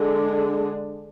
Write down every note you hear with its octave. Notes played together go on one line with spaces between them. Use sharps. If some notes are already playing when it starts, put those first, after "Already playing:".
Already playing: D3 G#3 D4 G#4